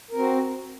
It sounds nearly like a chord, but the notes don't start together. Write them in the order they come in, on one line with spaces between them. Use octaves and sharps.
A#4 C4 F#4